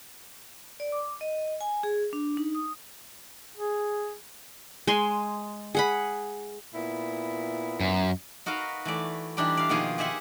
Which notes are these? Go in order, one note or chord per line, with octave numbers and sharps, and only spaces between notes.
D5
D6
D#5
G#5
G#4
D4
D#4
D#6
G#4
G#3 G#5 C6
G#4 F#5 B5
A#2 B3 E4
F#2
D#4 F#4 A#4 B4 F5
E3 A3 D5
E3 G3 D4 D#4 G4
D5 F5
B2 D#3 F3 A#3 F4 G#4
G4 G#4 C5 E5 F#5 G#5